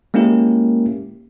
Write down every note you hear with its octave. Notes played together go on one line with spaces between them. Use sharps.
G#3 A#3 C#4 E4 G4 A#4